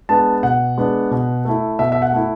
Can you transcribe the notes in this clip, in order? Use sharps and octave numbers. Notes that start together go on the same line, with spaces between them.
G#3 B3 D4 A5
B2 F#5
G#3 B3 D4
B2
A3 E4
B2 E5
E5
F#5
A3 E4